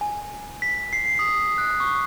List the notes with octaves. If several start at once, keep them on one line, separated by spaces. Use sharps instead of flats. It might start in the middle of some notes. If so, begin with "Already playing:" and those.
G#5
B6
C7
D#6
F#6
C#6